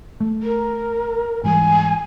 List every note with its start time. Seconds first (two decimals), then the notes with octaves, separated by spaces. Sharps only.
0.20 A3
0.42 A#4
1.44 G#2 E3 G3 G#5